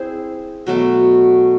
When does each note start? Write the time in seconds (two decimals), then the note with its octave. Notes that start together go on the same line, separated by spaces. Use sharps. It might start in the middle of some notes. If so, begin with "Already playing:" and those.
Already playing: C4 E4 G#4 C5
0.67 B2 F#3 A3